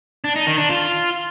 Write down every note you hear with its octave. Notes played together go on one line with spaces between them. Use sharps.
D4
D#4
D#3
D4
F4